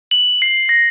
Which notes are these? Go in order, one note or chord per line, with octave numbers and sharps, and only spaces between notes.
F#7
C7
A#6